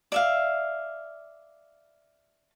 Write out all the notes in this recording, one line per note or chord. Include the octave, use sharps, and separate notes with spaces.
D5 E5 F5